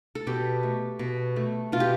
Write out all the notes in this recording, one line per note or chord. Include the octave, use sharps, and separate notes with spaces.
A4
B2 G4
A3
B2
A3
B2 F4
G4